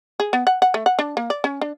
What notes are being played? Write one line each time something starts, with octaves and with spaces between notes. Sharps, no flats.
G#4
B3
F#5
F#5
A3
F#5
D4
A#3
D5
C#4
D4